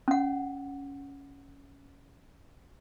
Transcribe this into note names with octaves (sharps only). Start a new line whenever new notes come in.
C#4 F#5